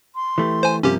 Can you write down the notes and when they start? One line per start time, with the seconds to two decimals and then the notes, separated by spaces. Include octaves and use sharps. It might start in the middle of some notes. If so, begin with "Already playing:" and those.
0.15 C6
0.38 E3 A3 G4
0.63 C5 G#5
0.83 G2 C3 F3 A#3 C#4 G4